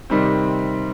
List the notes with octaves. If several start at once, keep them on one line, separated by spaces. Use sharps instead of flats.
C3 D#3 G3 C4